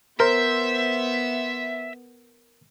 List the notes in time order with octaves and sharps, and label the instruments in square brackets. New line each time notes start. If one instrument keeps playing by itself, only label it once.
[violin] B3 [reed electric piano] A#4 [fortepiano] C5 [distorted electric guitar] E5